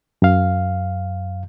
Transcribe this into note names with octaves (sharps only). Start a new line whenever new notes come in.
F#2 F5